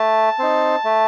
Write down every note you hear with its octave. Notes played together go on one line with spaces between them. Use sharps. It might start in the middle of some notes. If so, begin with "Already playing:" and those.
Already playing: A3 A5
C4 D#4
A3